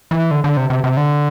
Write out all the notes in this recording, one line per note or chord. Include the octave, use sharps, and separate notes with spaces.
E3
D3
D3
C3
C3
C3
D3